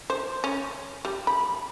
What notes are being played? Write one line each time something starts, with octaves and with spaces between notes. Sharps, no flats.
C5
C#4
G3
B5